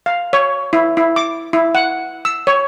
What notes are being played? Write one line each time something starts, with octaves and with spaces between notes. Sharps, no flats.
F5
C#5
E4
E4
D6
E4
F#5
E6
C#5